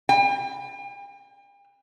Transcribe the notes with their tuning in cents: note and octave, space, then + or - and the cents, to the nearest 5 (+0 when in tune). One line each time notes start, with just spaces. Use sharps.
G5 +40